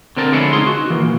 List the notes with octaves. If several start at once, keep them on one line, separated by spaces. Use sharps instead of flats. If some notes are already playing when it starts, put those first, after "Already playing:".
D3 C4 A#4 A5
D3 F3 G#3 B3 C#4 E4
C#2 D#4 G#4 C6
F#4
E3 A#3
A#2